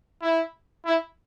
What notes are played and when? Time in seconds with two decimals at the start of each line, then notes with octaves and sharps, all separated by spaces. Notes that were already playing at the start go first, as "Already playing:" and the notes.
0.22 E4
0.85 E4